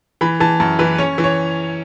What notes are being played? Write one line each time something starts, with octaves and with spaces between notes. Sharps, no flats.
E3 B5
E3 A5
F#2 A5
E3 B4
C#4 C#5
E3
C#5